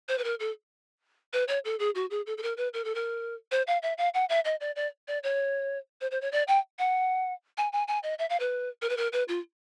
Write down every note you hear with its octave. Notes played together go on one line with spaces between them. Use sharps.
C5
B4
A#4
A4
B4
C#5
A4
G#4
F#4
G#4
A4
A4
A#4
B4
A#4
A4
A#4
C5
F5
E5
F5
F#5
E5
D#5
D5
D5
D5
C#5
C5
C5
C#5
D5
G5
F#5
G#5
G#5
G#5
D#5
E5
F5
B4
A#4
B4
A#4
B4
F4